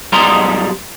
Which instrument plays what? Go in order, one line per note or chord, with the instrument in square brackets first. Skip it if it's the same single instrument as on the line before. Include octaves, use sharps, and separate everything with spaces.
[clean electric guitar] B1 G#2 G3 G#3 A#5 C6